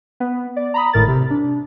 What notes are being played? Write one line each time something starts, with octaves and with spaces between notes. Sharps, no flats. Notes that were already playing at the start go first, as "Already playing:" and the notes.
B3
D5
A#5 B5 D#6
G#1 A2 A#4 A6
C3
D4